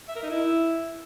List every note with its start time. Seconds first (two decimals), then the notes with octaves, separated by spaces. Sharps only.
0.08 E5
0.16 A#4
0.23 D#4
0.30 E4